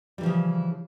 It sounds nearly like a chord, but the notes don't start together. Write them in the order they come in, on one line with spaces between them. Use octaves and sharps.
G3 E3 F3 C#3